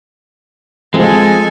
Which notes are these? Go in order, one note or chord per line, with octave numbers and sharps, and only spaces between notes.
F3 G#3 C4 F4 A4 G#5